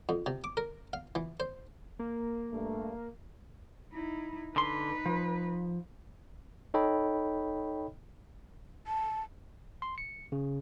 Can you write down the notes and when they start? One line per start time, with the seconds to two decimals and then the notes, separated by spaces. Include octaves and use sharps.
0.09 F2
0.26 C3
0.44 D6
0.57 A#4
0.93 F5
1.15 E3
1.40 C5
1.99 A#3
2.51 G2 A3
3.92 D#4 E4
4.56 D3 D#4 B4 C6
5.06 F3
6.74 D#4 A4 C#5 D#5 G5 B5
8.87 A5
9.82 C6
9.98 C#7
10.32 C#3